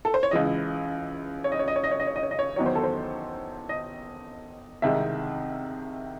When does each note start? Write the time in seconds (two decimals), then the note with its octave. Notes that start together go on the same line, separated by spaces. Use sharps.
0.05 A4
0.14 C5
0.23 C#5
0.31 C#2 C#3 E3 G#3 D#5
1.44 C#5
1.52 D#5
1.59 C#5
1.68 D#5
1.76 C#5
1.84 D#5
1.91 C#5
2.00 D#5
2.07 C#5
2.16 D#5
2.23 C#5
2.31 D#5
2.39 C#5
2.56 E2 D#3 F#3 C#5
2.66 C5
2.75 A4
2.83 C5
3.69 D#5
4.82 C2 C3 D#3 G#3 E5